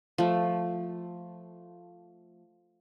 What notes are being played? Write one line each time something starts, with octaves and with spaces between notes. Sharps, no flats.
F3 A3